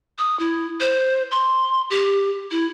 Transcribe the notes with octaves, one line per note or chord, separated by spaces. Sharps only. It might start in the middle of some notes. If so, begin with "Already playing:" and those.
D#6
E4
C5
C6
G4
E4